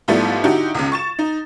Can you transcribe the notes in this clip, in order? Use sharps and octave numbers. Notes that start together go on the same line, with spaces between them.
G#2 F3 G3 A3 B3 E4
D3 D#4 E4 F#4 G4
C#2 C#3
C#6 A6 E7
D#4